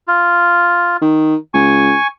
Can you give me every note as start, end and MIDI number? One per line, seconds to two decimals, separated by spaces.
0.08 0.97 65
1.02 1.35 51
1.54 1.94 37
1.54 2.07 80
1.54 2.07 85